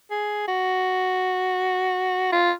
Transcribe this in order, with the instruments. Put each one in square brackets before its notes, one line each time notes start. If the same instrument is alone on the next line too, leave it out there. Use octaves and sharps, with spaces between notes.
[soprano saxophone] G#4
F#4
F4